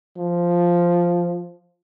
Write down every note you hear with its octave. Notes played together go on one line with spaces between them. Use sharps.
F3